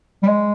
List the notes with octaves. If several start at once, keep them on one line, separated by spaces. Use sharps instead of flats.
G3
G#3